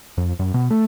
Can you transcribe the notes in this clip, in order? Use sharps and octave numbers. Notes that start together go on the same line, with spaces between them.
F2
F#2
B2
A3